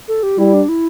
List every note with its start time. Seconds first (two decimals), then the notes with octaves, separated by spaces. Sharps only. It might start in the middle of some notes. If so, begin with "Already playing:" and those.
0.08 A4
0.23 G4
0.38 G3 E4
0.54 D4
0.69 E4